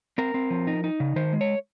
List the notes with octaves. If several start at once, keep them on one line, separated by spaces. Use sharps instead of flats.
C4 A#4
C4
F3
D#4
D#4
C#3
D#3 C5
G#3
C#5